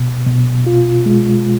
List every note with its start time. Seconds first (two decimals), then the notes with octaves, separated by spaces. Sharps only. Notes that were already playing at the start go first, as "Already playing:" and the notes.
Already playing: B2
0.27 B2
0.67 F4
1.06 G#3